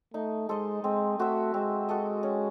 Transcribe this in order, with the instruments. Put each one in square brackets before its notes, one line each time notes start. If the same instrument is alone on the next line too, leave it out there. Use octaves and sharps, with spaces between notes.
[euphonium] A3 [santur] D#4
[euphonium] G#3 [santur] A4 C5 D#5
[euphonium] G#3 [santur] C4
[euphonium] A3 [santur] F#4 C5 E5
[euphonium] G#3 [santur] C4
[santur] F#4 A4 D#5
C#4